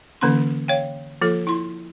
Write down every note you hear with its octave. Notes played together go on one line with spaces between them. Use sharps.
D3 E3 A#3 C#4 C6
C#5 F5 G5
F3 A#3 F4 A4
E4 C6